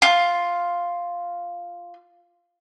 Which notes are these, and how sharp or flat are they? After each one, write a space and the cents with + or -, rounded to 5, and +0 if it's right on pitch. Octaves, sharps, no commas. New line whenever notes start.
F4 +0